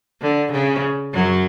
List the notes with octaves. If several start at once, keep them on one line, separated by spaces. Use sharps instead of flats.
D3
C#3
F#2 F#3